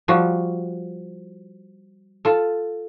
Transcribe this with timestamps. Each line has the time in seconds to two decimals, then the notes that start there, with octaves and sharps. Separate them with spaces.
0.08 F3 G3 F4 F#4
2.25 F4 A4